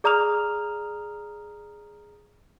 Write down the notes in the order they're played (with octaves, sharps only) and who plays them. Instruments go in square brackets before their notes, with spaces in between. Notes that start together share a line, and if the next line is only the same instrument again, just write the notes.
[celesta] G#4 D5 A#5 D#6 F6 F7